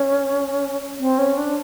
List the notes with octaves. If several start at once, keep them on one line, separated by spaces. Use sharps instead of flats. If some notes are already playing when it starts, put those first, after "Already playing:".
Already playing: C#4
C4
C#4
D4